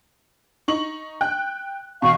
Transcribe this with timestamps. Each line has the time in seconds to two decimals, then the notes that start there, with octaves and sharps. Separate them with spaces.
0.68 D#4 C#6 F#7
1.21 G5 F#6
2.02 E2 B2 F5 C#6